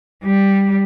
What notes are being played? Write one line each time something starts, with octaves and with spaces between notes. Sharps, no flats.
G3